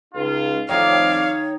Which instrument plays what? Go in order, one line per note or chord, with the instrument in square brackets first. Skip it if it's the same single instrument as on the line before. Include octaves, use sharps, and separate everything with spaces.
[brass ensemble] C#2 D#4 F4
[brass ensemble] F2 A2 D5 [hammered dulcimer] D#3 [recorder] C#5 [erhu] F5